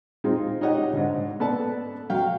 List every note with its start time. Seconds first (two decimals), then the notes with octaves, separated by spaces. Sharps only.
0.24 G#3 C4 D#4 F4
0.61 D#4 G4 C#5 D#5 F#5
0.93 G#2 D3
1.40 B3 A4 D5 A5
2.10 F#3 F5 G5